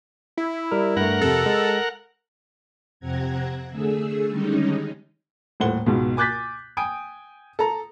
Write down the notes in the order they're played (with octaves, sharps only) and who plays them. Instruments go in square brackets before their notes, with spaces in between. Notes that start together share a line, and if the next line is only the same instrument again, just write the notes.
[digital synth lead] E4
[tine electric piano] G3 A#4
[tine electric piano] G2 A3 [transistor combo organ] A#4 F#5
[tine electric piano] F2 C3 [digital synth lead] A4
[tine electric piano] G#3
[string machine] F2 C3 C4 F#5 A#5 G#6
D3 A3 G#4 E6
D3 D#3 G3 G#3 C#4 D#4
[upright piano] D#1 A2 C5 F#5 G7
C#2 G#2 B2
G#5 D6 F#6 G6 A6 B6
G5 G#5 D#6 D7
A4 A#5